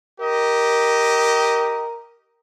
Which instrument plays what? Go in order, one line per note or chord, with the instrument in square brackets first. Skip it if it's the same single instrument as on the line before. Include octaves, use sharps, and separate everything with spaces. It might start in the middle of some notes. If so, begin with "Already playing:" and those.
[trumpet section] G4 D#5 [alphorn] A#4